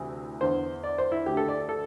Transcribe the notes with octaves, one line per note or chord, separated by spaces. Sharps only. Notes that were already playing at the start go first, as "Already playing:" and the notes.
Already playing: D2 C3 E3
E2 D3 C5
D5
C5
E4
D2 D3 G4
A4
D5
A4